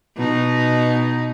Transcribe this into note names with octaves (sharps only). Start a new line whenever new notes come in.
B2 D#4